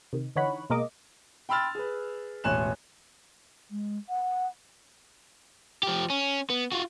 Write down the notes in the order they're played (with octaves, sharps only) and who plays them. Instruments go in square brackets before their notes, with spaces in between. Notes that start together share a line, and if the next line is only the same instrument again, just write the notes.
[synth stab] C3 D#3
D3 E3 D#4 C#5 F#5 B5
B2 G#3 A#3 A#4 D#5 D6
[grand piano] G5 B5 C6 E6 F6 A6
G#4 B4
E1 A1 C#5 G#5 F#6 E7
[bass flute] G#3
F#5
[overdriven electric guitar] F3 G4
C#4
B3
F4 F#4